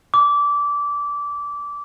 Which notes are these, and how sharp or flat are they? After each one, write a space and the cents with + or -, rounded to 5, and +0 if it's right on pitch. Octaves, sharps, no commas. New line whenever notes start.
D6 -20